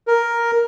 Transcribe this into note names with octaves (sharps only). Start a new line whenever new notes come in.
A#4